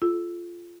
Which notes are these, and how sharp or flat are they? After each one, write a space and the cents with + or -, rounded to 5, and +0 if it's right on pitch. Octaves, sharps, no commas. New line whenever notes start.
F4 -10 A4 -40